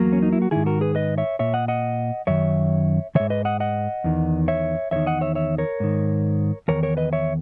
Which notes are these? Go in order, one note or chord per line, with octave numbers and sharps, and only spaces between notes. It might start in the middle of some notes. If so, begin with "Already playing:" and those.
Already playing: E2 F#3 A#3
C#4
D#4
E4
F#4
G#2 D#3 E4 G#4
F#4 A#4
G#4 B4
B4 D#5
C#5 E5
A#2 C#5 E5
D#5 F#5
D#5 F#5
F#2 D#3 C#5 E5
G#2 D#3 C#5 E5
B4 D#5
D#5 F#5
D#5 F#5
E2 D#3
C#5 E5
E2 D#3 C#5 E5
D#5 F#5
C#5 E5
C#5 E5
A#4 C#5
G#2 D#3
E2 D#3 A#4 C#5
A#4 C#5
B4 D#5
C#5 E5